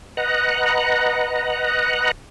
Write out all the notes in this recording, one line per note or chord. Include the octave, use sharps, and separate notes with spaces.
B4 D#5 F#5 A#5 F#6